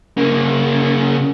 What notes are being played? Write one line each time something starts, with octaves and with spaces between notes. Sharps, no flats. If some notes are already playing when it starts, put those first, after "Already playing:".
C#3 A#3